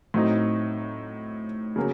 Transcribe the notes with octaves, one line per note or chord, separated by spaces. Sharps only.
A2 F#3 C4 D#4
C#3 F#3 A#3